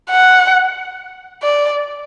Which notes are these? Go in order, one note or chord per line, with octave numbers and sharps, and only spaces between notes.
F#5
D5